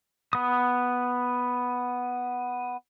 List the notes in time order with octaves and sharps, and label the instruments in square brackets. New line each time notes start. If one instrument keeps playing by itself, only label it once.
[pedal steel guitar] B3 D#6